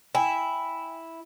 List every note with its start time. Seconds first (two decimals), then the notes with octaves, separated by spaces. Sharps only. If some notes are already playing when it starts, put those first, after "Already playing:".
0.15 E4 G5 G#5